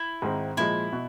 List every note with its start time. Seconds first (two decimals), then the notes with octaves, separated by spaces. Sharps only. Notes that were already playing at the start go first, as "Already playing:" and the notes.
Already playing: E4
0.22 G#2 D#3 G#3 C4
0.57 A#2 F3 G#3 E4
0.92 B2